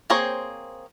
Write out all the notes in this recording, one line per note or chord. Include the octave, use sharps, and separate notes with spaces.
A#3 C4 G#4 C5 C#5